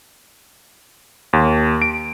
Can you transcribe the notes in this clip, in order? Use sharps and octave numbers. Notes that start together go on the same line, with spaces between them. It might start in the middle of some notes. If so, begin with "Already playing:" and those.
D#2
D7